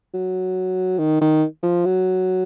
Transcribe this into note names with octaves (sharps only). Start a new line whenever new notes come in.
F#3
D#3
D#3
F3
F#3